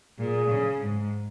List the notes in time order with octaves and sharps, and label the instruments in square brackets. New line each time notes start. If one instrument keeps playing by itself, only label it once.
[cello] A#2 [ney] G#4
[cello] C#3
G#2